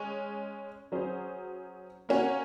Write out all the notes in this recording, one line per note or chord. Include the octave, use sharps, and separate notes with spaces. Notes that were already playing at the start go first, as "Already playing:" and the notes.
Already playing: G#3 C#4
F#3 C#4 G#4 C5
A#3 C#4 F#4